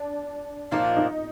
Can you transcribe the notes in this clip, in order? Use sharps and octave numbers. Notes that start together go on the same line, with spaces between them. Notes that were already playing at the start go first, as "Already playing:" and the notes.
Already playing: D4
A#2 F3 A#3 D4 D#4
D#4